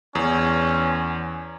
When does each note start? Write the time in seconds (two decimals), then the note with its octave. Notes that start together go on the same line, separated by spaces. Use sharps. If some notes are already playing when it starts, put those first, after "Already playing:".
0.15 E2 C#4